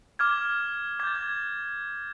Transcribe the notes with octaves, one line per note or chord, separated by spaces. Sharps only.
D6 F6 G#6
D6 G6 G#6 A6
G#6